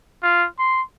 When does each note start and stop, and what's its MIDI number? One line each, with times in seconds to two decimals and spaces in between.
0.22 0.45 65
0.59 0.81 84